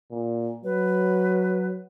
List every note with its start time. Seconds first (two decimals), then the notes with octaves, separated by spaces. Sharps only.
0.11 A#2
0.64 F#3 B4